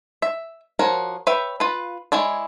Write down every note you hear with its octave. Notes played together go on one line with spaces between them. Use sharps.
E5
F3 F#4 A#4 C#5
B4 C#5 E5 G5
F4 B4
G#3 E4 C#5 D5